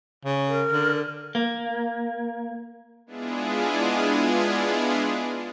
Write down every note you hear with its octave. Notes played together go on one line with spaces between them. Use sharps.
C#3
A#4
D3
A#3
G#3 B3 D4 E4 F4 G#4